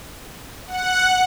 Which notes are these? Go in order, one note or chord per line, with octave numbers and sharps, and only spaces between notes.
F#5